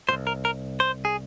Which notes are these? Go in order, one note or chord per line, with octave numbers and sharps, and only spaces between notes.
A#2 C5
C2
A#4
A#4
C5
G#4